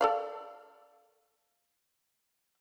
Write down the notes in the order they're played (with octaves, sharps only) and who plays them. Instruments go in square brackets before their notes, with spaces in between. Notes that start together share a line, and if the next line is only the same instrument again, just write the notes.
[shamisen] A4 D5 F5